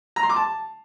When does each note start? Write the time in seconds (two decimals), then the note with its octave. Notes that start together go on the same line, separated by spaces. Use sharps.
0.16 A#5
0.23 C6
0.30 D6
0.36 A5